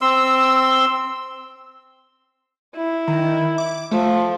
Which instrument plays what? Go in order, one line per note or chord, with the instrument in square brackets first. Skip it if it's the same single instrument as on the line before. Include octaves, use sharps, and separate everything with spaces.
[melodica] C4 C6 E6
[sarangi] E4
[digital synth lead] D#3
D6
[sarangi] F3 [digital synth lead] A3